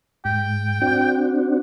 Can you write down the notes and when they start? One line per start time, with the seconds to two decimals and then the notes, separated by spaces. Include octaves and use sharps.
0.25 G#2 G5
0.82 C4 D4 F#4